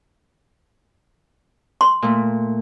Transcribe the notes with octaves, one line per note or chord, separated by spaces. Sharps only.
C6
A#2 A3